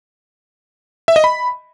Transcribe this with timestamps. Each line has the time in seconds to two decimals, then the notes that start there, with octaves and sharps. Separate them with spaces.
1.08 E5
1.16 D#5
1.24 B5